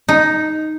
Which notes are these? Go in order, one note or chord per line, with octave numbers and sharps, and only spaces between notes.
D#4